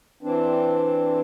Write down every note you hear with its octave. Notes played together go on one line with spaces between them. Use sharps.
E3 C4 D4